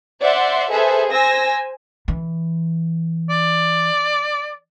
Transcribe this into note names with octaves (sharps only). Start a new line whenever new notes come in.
C5 D5 E5 F#5 C6
G#4 A4 B4 C5 E5
C5 G#5 E6 A#6
E3
D5